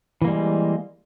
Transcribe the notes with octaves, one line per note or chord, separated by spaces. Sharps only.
E3 G3 G#3 A#3